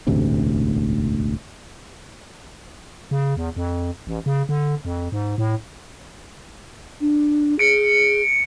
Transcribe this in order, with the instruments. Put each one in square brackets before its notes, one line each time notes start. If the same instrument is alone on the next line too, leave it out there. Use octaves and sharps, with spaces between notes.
[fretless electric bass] E1 A1 D2 C3
[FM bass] C#3
E2
F2
A1
C#3
D3
F2
G#2
A2
[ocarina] D4
[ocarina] G#4 [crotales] C#7 D7